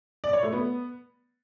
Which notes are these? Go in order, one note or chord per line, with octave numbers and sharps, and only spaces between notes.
D5
C#5
A3
B3